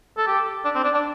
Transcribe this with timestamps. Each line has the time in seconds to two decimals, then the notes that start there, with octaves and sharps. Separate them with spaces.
0.17 A4
0.27 G4
0.65 D4
0.75 C4
0.84 D4
0.94 D4